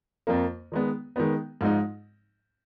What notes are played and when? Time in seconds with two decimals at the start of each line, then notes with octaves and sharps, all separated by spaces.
0.27 F2 F3 A#3
0.72 D#3 G#3 B3
1.16 D#3 G#3 B3
1.61 G#2 F3 G#3 D#4